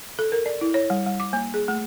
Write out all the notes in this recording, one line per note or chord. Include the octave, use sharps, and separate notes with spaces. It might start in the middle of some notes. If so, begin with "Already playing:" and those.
A4
A#4
D5
E4
C#5
G3
G3
D6
A#3
G#4
A3